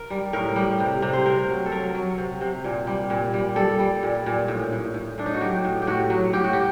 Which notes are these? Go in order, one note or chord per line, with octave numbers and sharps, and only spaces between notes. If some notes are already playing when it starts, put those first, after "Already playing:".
Already playing: A#4
G3
A2 A#4
G3
C3
C3
C5
C3 A#4
F#3
A4
F#3 A#4
F#3
C3
C3
A#2
G3
A#2
G3
G3 A4
G3
A#2
A#2
A2
A2
A2
A2 D4
D#4
F#4
F#3 G4
A2
G4
A2 F#4
F#3
A2 G4
F#4
G4